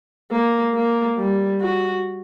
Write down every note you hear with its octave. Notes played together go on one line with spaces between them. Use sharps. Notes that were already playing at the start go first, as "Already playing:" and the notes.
A#3
A#3
G3
F#4